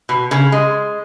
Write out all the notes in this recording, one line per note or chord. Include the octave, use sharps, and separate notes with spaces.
B2
C#3
G#3